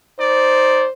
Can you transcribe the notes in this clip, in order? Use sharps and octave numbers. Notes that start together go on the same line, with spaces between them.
D#4 C5 D5